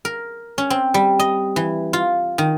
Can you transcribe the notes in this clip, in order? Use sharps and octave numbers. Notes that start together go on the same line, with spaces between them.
A#4
C#4
C4
G3
D#5
E3
F4
D#3